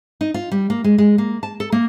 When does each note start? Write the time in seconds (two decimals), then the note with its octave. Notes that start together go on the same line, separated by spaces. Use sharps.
0.21 D#4
0.34 F4
0.52 G3
0.70 A#3
0.84 G#3
0.98 G#3
1.18 A#3
1.43 A5
1.60 A4
1.72 A#3